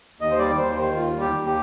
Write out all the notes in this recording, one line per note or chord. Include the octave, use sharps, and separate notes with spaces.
D#2 D#5
C5
G3 D5
D#2 C5
D#3 C5
D#2 F4
G3
G4
D#2
G4